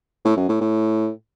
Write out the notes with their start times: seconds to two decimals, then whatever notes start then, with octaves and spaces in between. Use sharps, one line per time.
0.25 A2
0.37 F#2
0.49 A2
0.61 A2